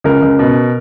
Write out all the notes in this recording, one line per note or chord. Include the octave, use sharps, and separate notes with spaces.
C#2 A#4
C#2
B2